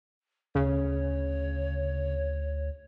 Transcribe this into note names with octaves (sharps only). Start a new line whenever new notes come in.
D2 C#3 C#5